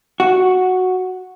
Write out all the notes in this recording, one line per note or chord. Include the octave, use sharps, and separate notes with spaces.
F#4